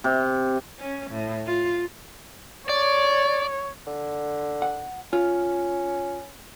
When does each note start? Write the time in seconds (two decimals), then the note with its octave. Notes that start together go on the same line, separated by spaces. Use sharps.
0.04 C3
0.79 C#4
1.11 A2
1.46 F4
2.69 C#5 D5
3.87 D3
4.62 F#5
5.13 C#4 F4